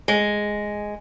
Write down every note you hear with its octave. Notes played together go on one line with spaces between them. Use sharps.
G#3